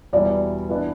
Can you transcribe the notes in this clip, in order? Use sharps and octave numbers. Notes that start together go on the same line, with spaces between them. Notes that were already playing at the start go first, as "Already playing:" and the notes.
E2 B2 G3 E4 D5
E3 B3 D4